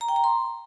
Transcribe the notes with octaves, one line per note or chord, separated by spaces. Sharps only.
A#5
G5
A#5
C6